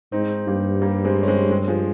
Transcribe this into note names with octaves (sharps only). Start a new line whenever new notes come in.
G#2 C4 D#4
G2 G3 A#3
G3 A#3
G#3 C4
C#4
G#3 C4
G#3 C4
F3 G#3